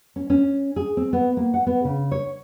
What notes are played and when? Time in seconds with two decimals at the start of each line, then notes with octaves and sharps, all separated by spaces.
0.16 C#4
0.30 C#4
0.76 G#4
0.97 C4
1.13 B3
1.37 A#3
1.54 F#5
1.67 B3
1.85 C#3
2.12 C#5